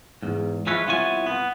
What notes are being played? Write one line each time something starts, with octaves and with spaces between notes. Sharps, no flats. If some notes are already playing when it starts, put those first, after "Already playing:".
E2 G#2
F3 G#3 E4 F4 B4 C#5
C2 B3 E4 F4 C#5 G#5
B3